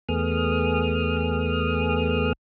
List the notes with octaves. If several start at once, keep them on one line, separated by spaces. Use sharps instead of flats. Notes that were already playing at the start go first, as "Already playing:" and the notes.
E2 A3 B3 G#4 D#6 F6